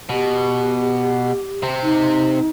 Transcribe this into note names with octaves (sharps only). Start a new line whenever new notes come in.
B2 G4
C3 C4
D#4